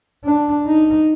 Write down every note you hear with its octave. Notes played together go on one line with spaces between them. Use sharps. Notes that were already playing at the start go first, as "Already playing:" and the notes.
D4
D#4